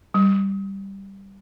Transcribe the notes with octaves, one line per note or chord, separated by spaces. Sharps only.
G3